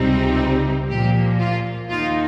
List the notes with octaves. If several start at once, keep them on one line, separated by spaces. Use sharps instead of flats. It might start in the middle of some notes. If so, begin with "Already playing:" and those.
Already playing: C#2 C3 G3 C4 D#4
A#2 F3 A#3 G4
F4
D#2 D#3 A#3 D#4 F4